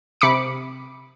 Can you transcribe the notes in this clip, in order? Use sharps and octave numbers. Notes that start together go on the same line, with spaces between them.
C3 B5 D6 C#7